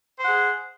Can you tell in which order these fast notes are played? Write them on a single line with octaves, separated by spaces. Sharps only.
C5 F#5 G#4